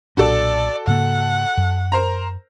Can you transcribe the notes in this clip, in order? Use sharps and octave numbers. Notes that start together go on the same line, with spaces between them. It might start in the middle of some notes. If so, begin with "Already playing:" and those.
B1 A#2 D4 F#4 A4 D5
G#2 C#3 A#3 F#5
F#2
A#4 C5 A#5